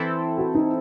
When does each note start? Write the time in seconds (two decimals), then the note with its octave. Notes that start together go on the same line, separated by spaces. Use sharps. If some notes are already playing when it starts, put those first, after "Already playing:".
Already playing: E3 C4 E4 A4
0.38 F#4
0.55 D#4